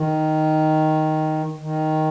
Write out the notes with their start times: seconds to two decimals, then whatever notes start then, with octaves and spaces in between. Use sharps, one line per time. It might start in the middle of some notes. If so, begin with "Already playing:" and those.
Already playing: D#3
1.59 D#3